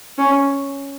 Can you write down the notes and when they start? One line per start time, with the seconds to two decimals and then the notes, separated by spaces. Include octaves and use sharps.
0.18 C#4